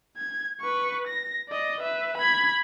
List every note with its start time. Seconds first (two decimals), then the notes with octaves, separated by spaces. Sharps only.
0.18 G#6
0.61 B4 C#6
1.08 A#6
1.49 D5 D#5
1.81 B4 E5
2.18 B5 G#6